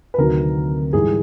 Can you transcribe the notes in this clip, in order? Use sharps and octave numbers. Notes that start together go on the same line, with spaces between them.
B4
D2 C3 D#3 F#3 A#4
G#2 E3 G3 G#4